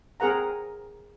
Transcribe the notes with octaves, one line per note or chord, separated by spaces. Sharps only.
C4 G#4 A#4 F#5 A#5